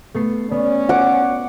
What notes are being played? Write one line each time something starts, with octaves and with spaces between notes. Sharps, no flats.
A3 B3 C7
B3 C#4 D5
F#5 D6